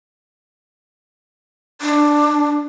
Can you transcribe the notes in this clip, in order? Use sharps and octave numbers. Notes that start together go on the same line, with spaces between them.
D4